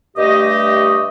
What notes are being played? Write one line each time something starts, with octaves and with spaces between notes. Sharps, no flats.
G2 A3 G4 D#5